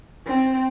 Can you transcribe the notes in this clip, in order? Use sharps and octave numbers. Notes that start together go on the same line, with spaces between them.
C4